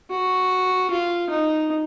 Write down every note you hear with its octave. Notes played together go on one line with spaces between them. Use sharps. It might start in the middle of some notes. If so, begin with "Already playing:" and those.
F#4
F4
D#4